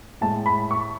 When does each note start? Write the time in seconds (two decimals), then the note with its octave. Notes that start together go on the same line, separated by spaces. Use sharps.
0.21 A2 G#3 A5
0.46 B5
0.71 C#6